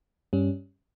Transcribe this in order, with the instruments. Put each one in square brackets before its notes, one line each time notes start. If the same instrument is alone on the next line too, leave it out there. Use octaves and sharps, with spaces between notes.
[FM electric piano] G2 G3 C#4